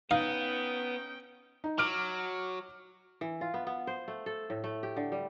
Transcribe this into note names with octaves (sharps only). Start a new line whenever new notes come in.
B3 C#4 D#4 F5 G5
D#4
F#3 D6 F6 D7
E3
F4
B3
B3
C5
A3
A4
A2
A3
G4
D3
G3